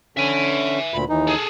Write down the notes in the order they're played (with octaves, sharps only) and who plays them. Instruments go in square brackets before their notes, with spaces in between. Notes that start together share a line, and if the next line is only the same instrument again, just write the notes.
[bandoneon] D3 C#4 [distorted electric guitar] E5 G#5
[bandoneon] D2 A#2 B5
D#2 E3 D#4
[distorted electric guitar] G#4 A4